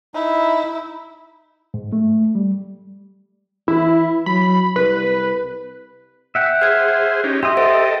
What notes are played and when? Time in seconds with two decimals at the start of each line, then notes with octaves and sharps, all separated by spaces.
0.14 D#4 E4
1.74 G#2
1.93 A3
2.35 G3
3.68 E3 E4
4.26 F#3 B5
4.76 C2 B4
6.35 E5 F#5 G5
6.61 G#4 C5 F6 G#6
7.24 C#4 D#4 G4
7.43 G4 D#5 E5 C6 D#6
7.57 A4 C5 D#5 F#5 D7